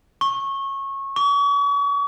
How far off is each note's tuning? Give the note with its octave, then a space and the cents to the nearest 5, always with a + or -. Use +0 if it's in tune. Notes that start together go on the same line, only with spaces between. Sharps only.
C#6 -20
C#6 +40